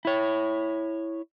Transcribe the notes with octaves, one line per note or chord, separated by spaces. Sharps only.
E4 C#5